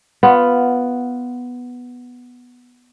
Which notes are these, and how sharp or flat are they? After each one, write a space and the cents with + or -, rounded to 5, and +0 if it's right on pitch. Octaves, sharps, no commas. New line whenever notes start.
B3 +0 F4 +0